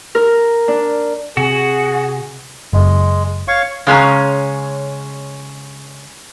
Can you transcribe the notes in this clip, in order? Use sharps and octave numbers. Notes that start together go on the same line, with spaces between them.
A#4
D4
C3 F#4 G#4 G#5
F#1 G#3
C#5 F5 C#6
C#3 G#3 C#4 A#5